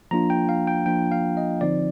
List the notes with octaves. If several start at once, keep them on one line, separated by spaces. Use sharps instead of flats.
F3 A#3 D4 F4 A#5
G5
F5
G5
F3 A#3 D4 F4 G5
F5
D#5
D3 F3 C4 D#4 D5